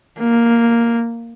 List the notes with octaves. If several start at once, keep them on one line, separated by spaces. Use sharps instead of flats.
A#3